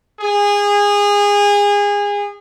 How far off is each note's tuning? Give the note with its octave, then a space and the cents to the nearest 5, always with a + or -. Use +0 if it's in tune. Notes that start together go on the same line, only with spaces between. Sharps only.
G#4 -25